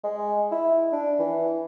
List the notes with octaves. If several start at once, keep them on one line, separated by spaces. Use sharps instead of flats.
G#3
E4
D4
E3